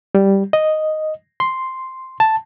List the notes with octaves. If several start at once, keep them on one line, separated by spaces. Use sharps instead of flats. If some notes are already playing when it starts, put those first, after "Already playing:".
G3
D#5
C6
A5